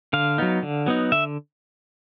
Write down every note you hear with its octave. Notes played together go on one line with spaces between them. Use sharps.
D3 F5
F#3 B3 D#4
D3
F#3 B3 D#4
D3 E5